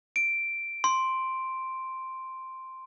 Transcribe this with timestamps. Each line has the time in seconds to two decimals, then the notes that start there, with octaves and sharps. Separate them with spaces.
0.16 D7
0.84 C6